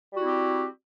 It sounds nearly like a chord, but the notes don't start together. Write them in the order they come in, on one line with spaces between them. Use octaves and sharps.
G3 F#4 E4 C4 G4